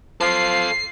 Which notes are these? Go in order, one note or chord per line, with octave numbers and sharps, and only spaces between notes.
F3 A4 F5 C7